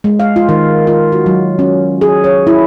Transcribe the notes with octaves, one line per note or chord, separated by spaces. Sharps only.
G#3
F5
F4
D#3
F4
F#4
F#3
C#4
G#4
C#5
E4